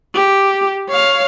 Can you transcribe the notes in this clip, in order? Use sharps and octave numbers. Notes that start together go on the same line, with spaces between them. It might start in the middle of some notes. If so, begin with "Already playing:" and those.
G4
C#5 F5